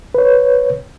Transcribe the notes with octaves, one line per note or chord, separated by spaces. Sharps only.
B4 C#5